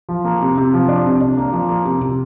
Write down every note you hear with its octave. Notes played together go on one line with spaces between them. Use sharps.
F3
A#3
C3
C3
F3
D4
C3
D4
A#3
F3
A#3
C3
C3